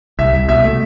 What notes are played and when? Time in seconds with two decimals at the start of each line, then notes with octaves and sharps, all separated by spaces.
0.19 C2 E5
0.33 C2
0.49 B2 E5
0.64 A3